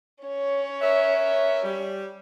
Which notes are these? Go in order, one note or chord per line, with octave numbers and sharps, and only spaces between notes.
C#4 C#5
A#4 B4 E5
G3